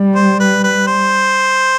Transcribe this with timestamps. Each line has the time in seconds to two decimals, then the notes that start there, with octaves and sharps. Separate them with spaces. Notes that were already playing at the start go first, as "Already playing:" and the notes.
Already playing: G3
0.15 C5
0.40 B4
0.64 B4
0.87 C5